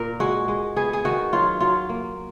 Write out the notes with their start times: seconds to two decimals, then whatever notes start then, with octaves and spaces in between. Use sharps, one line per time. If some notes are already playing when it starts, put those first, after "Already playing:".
Already playing: A#2 A#4
0.20 G#3 F#4
0.48 G#3
0.76 B3 G#4
0.93 G#4
1.05 D#3 F#4
1.33 F#3 F4
1.61 F#3 F4
1.89 A#3